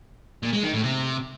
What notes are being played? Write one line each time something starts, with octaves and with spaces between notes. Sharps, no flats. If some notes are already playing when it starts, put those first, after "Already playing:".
A#2
G#3
D#3
A2
C3